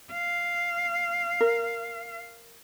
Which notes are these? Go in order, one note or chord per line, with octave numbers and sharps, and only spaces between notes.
F5
A#4